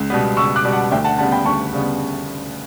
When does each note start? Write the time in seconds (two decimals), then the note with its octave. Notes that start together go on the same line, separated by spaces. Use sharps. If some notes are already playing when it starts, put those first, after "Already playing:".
Already playing: C#2
0.10 B2 G3 B3
0.37 C#2 C#6 E6
0.56 D6 F#6
0.64 B2 G3 B3
0.73 F#5 A5
0.92 D2 E5 G5
1.04 F#5 A5
1.18 C#3 G3 B3 F#5 A5
1.32 G5 B5
1.45 D2 A5 C#6
1.73 C#3 G3 B3